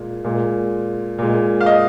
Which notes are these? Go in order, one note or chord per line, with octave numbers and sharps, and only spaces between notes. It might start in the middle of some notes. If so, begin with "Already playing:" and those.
Already playing: A#2 G#3
A#2 G#3
A#2 G#3
F5
D#5